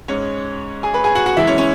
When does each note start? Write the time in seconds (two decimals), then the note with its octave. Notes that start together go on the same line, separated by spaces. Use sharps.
0.08 G#2 G#3 C#4 C#5
0.83 G#4 G#5
0.94 B4 B5
1.04 G#4 G#5
1.15 F#4 F#5
1.26 F#4 F#5
1.36 F#2 E3 G#3 E4 E5
1.47 C#4 C#5
1.58 C#4 C#5